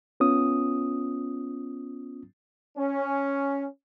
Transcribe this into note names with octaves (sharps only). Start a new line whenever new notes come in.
B3 C#4 F4 D#6
C#4